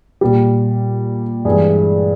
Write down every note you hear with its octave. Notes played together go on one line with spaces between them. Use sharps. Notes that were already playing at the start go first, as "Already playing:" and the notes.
A#2 G3 G4
G2 E3 G#3 G#4